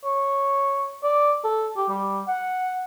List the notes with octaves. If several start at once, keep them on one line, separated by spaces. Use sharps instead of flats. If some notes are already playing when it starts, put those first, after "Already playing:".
C#5
D5
A4
G4
G3
F#5